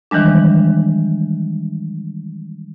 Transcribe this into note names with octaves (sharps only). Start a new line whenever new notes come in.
D#3 E3 G3 G#3 D4